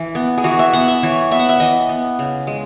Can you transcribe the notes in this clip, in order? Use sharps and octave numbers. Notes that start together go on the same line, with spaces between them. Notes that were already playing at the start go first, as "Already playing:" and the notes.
Already playing: E3
B3
G#4
E3 F#4
E5
B3 F#5
E5
E3 C#5
B3 E5
F#5
E5
E3 D#5
B3
C#3
G#3